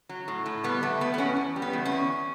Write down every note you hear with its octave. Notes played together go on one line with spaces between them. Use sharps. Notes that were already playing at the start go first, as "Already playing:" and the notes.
F#3
A2
A2
G3 B3
E2 A3
E2 B3
B3
E2 C#4
E2
G3
B3
E2
C#4
E2